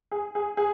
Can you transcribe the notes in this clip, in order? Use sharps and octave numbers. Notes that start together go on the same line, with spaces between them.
G#4
G#4
G#4